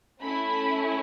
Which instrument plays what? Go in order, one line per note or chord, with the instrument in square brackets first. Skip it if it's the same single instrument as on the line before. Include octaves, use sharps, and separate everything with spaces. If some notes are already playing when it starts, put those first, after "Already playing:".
[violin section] A3 C#4 E4 B5